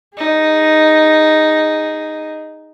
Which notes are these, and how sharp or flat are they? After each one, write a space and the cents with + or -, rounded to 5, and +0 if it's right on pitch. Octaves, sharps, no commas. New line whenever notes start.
D#4 +0 G#4 -15